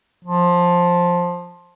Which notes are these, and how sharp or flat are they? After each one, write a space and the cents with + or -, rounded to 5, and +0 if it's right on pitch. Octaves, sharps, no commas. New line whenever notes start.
F3 +10